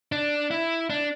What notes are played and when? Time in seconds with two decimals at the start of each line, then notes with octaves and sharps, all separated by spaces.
0.12 D4
0.51 E4
0.90 D4